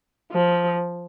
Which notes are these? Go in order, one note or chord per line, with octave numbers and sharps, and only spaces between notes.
F3